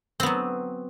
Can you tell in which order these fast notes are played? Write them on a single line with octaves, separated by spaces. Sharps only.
C4 B3 F#3